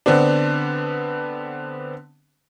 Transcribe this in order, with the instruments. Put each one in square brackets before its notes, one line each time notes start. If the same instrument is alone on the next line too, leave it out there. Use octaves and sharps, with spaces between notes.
[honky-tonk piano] D3 B3 C4 D4